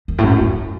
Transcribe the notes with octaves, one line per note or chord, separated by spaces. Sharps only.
F#2
A2
F#2
F#2